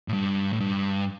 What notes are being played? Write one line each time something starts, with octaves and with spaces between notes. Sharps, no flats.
A2
G2
A2
G2